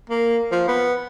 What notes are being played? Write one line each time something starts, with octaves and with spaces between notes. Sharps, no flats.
A#3
F3
B3